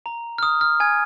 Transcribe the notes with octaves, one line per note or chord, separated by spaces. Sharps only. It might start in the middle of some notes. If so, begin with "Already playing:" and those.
A#5
F6
D#6
F6
G#5 G#6